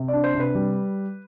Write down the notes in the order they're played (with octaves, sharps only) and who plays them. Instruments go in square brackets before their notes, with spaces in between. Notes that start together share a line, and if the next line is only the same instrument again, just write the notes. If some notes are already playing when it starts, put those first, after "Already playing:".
Already playing: [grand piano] C3
D5
D4
C5
C3
B4
G3